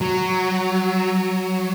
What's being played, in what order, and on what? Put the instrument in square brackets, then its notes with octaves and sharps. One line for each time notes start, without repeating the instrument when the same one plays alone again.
[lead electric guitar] F#3